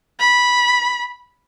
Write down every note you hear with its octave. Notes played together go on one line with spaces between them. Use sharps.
B5